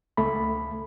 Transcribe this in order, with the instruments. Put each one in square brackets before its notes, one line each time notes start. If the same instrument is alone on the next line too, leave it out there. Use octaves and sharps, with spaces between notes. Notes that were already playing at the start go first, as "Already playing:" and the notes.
[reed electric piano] C#2 A3 B5